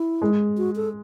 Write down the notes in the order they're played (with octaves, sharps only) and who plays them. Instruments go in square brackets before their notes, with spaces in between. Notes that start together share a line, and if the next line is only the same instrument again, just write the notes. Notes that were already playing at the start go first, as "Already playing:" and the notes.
Already playing: [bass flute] E4
[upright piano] G#3
[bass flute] F#4
A4